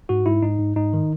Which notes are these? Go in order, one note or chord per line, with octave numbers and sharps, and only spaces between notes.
G#2 F#4
G#2 E4
G#2 D#4
G#2
G#2 D#4
D#3